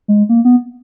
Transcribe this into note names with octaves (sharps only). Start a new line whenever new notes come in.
G#3
A#3
B3